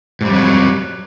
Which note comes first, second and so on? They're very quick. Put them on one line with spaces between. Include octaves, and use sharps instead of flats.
G#2 G3 F2 F#3